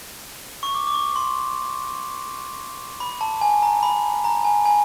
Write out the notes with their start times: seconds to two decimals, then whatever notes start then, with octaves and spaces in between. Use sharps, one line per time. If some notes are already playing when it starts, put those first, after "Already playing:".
0.63 C#6
0.75 D6
0.87 D6
0.94 C#6
1.16 C6
3.00 B5
3.21 A5
3.41 G#5
3.63 A#5
3.83 B5
4.24 A#5
4.45 G#5
4.66 G#5